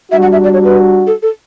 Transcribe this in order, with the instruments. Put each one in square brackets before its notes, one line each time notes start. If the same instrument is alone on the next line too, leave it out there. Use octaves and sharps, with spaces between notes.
[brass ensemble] G3 D4 F#4 [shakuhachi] E5
[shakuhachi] F#5
E5
D5
C#5
B4
A4
A4